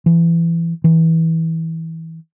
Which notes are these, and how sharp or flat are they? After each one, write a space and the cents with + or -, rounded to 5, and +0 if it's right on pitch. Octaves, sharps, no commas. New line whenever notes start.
E3 +25
E3 -20